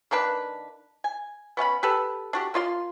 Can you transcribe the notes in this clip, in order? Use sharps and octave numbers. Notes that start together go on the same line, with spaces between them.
D#3 A#3 D4 B4
G#5
B3 C#4 F5 B5
G4 A4 B4
D4 F#4 G4
A#3 F4 D5 C6